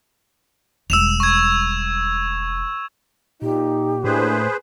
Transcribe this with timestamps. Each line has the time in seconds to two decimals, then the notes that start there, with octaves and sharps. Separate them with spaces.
0.90 E1 G3 E6 E7 F7
1.20 C#6 G#6
3.42 A#2 D#4 G4
4.04 A2 A3 A#3 D4 G#4 B4 C5